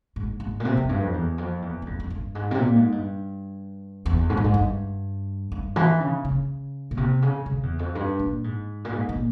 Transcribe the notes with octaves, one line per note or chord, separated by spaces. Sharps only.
G#2
G#2
A#2
C3
F2
G2
F2
E2
F2
E2
G2
F2
F2
G2
G#2
C3
A#2
G#2
G2
E2
G#2
G2
G#2
G2
G2
E3
C#3
C#3
A#2
C3
C#3
C#3
F2
E2
F2
G2
A#2
G#2
A#2
G#2
A#2